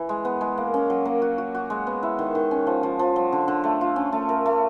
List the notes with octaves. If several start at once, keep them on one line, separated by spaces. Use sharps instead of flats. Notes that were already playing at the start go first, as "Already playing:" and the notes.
Already playing: E3
G#3
B3
G#3
A#3
C#4
F#3
A#3
F#4
F#4
F#4
G#3
B3
E4
D#3
D#3
C#4
F3
F3
F3
F#3
D3
D3
A3
F4
C#4
A3
A#4
A3